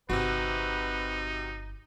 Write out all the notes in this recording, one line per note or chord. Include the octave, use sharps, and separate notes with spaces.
G1 C3 D#4 F#4 B4